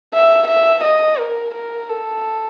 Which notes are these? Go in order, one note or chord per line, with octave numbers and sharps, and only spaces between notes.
E5
E5
D#5
A#4
A#4
A4